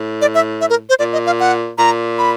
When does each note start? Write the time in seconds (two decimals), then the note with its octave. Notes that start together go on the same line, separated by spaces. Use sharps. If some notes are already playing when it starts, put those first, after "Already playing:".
Already playing: A2
0.21 D5
0.35 E5
0.61 E5
0.70 A#4
0.89 C5
0.99 A#2 D5
1.13 D#5
1.26 F5
1.40 F#5
1.78 A#2 A#5
2.18 B5